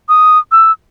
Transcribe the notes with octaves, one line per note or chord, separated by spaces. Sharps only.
D#6
E6